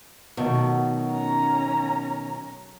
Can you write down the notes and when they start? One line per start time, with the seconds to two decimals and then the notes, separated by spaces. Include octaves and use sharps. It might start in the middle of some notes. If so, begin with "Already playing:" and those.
0.37 B2 D#3 F#3 A3
1.07 C#4 A#5